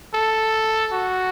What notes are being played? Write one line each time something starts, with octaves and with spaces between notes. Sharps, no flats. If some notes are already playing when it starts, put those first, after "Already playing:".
A4
F#4